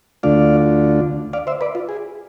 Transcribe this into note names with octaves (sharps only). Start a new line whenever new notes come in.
D2 D3 A3 D4 F4 D5 F5
D5 F5
C5 E5
B4 D5
F4
G#4